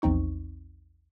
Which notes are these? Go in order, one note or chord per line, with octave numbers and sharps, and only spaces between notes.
A#1 E2 C4 D#4 C#6